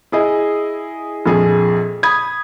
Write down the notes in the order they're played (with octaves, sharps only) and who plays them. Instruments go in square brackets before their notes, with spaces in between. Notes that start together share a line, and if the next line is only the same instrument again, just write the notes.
[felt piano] E4 G#4 D#5
A#1 F2 G#4
B5 D#6 G#6